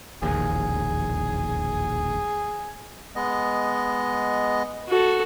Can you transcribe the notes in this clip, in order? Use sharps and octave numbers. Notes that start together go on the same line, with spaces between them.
E1 A#1 D#2 G#4
G#3 B3 D#5
F#4 A4